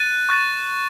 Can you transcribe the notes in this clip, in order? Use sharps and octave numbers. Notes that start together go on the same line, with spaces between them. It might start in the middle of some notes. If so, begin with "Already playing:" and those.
Already playing: F#6 A6 D#7
C#6 F#6 A6 D#7